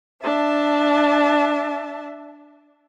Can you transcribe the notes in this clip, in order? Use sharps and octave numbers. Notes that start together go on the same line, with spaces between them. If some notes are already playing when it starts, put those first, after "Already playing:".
D4 E5 A5